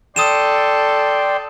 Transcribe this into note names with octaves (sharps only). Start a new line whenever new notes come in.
A4 D5 G5 C6 D#6 D#7 E7